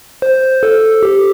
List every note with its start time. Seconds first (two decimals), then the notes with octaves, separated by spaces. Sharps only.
0.22 C5
0.63 A4
1.03 G4